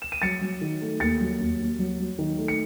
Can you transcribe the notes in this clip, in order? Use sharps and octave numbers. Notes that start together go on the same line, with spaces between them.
E7
D#7
F#3 A6 C#7
F#3
D#3
A3
D#2 A6 C#7
F#3
D#2
D#2
F#3
F#3
D#3
A3
C#7